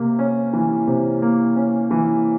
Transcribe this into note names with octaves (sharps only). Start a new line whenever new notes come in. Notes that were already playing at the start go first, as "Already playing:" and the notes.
Already playing: C3 A#3
C#4
E3
C3
A#3
C#4
E3